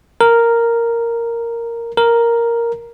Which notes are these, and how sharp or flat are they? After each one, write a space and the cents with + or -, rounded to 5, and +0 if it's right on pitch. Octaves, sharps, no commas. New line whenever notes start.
A#4 -5
A#4 +0